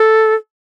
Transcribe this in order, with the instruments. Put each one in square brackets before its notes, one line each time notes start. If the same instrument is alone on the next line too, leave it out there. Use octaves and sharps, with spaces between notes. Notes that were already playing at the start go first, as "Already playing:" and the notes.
Already playing: [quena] A4